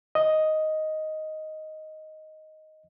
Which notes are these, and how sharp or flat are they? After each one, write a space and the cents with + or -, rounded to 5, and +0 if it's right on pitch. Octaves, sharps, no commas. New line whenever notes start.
D#5 +5